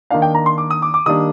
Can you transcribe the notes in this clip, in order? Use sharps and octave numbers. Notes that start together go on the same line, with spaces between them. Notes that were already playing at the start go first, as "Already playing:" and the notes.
D#3 A#3 D4 F5
G5
A#5
C6
D6
D#6
D6
D6
D#3 G3 A#3 D4 D#6